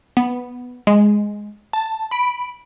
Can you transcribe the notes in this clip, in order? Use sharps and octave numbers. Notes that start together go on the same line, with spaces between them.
B3
G#3
A5
B5 D7